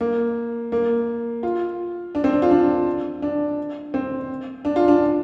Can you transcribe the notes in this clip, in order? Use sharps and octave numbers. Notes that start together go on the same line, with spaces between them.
A#3
A#3
F4
D4
C4
D4
F4
D4
D4
C4
D4
F4
D4